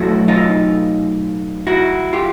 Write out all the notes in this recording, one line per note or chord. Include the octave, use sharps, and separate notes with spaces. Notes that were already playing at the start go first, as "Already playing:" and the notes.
Already playing: B2 F#3 A3 E4 F#4
D#4 F4
E4 F#4
F4 G4